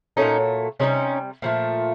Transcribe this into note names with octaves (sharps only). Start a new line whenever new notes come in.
A#2 F#3 A3 C#4 D#4
C3 E3 G3 C#4 D#4
A#2 F3 A3